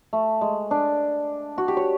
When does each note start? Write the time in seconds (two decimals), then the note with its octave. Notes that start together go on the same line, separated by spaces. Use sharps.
0.13 A3
0.41 G#3
0.71 D4
1.58 F#4
1.68 G4
1.77 C#5